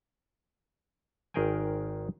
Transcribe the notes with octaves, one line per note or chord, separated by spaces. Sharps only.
G#1 D#3 G#4 A#4 G5 G#5